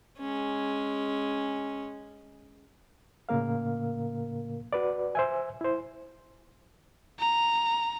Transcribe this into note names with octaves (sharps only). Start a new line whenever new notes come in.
G#3 C#4
A2 C#3 A#3 A#4 F5
F#4 B4 D5
C5 E5 G#5
E4 C5
A#5